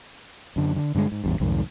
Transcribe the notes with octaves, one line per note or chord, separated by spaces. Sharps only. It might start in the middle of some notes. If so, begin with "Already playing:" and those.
F#2 D3
D3
G2 D3 D#3 G#3
G#2
A1 E2 G2
C2 F2 G#2 D#3